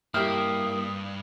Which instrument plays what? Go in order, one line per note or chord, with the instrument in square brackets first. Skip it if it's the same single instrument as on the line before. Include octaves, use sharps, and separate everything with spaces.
[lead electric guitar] G2 [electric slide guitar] A#3 E4 [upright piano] G4 F6 [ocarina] D#6